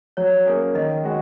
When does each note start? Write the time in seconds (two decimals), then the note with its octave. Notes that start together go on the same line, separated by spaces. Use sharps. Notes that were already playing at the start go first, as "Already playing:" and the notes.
0.17 F#3 C#5
0.46 A#3 C#4 G#4
0.75 D#3 D#5
1.04 G#3 F#4